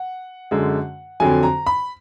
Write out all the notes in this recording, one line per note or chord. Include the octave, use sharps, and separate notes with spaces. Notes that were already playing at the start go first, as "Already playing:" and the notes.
Already playing: F#5
F#2 D3 G#3
F2 D3 F#3 G#5
A#5
B5